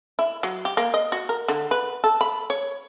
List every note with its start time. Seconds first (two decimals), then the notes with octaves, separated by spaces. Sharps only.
0.19 E4
0.43 F#3
0.65 G4
0.77 A#3
0.94 D#5
1.12 F#4
1.29 A#4
1.48 D3
1.71 B4
2.04 A4
2.21 B5
2.50 C#5